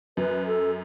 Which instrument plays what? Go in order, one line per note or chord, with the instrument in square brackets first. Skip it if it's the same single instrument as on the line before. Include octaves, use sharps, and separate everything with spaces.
[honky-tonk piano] F#2 [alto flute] B4
[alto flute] A4